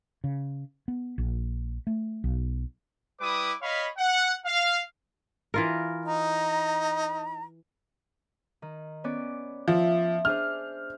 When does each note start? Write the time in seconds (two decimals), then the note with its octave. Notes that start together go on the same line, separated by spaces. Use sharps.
0.24 C#3
0.88 B3
1.18 A#1
1.87 A3
2.24 B1
3.20 G3 E4 B4 D6 D#6
3.62 C#5 D#5 F5 B5
3.97 F#5
4.45 F5
5.54 E3 F4 A#4
6.06 D#4 A#5
8.62 D#3
9.04 B3 C#4 D5
9.68 F3 E5
10.25 D4 G#4 C5 F6